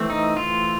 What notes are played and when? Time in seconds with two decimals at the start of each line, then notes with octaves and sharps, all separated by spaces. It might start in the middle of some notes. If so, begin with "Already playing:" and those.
Already playing: E3 A3 C4
0.10 D#4
0.37 F4